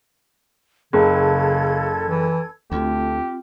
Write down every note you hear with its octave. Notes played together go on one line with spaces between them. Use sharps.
F#1 C#3 A4 G#6
E3
D2 A3 C4 F4 G4